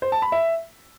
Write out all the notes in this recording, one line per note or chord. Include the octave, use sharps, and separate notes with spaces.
C5
A5
B5
E5